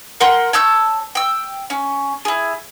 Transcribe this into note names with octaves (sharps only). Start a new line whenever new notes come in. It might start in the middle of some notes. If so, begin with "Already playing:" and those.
A#4 F#5 G5 C6
C#5 A5 E6 G6
G5 E6
C#4
E4 G#4